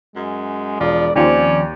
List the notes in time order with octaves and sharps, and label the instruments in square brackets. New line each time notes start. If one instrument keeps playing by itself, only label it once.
[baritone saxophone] F#2 [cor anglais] G#3
[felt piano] E1 [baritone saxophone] F3 [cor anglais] D5
[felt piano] D#2 [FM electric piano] D#3 F3 C4 [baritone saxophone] C#4 [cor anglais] D5